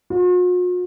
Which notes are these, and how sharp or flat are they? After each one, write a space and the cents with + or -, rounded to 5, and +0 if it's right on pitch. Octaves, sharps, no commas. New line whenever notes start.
F#4 -45